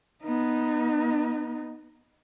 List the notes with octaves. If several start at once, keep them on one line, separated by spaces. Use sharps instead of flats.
B3 D#4